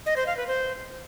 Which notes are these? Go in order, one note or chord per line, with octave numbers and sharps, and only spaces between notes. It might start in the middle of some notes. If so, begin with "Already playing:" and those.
D#5
C5
F5
B4
C5